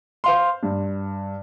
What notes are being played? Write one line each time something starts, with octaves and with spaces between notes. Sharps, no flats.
C5 F5 C6
G2